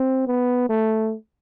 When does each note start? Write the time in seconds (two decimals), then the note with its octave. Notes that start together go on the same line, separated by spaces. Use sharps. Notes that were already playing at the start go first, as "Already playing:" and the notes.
Already playing: C4
0.27 B3
0.70 A3